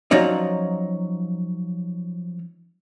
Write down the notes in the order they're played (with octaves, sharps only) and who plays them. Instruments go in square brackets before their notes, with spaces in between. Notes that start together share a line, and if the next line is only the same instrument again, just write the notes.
[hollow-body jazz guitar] F3 F#3 C#4 D#4 D5